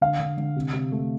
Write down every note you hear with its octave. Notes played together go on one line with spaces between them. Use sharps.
D3 F5
D3
D3
C3
C3
A3